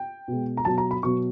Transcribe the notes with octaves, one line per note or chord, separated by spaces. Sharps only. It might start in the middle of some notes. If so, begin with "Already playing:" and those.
Already playing: G5
B2 G#3
A#5
B2 F#3 A5
A#5
B5
B2 F#3 C#6